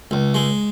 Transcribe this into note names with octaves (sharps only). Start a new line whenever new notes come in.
C#2
G#3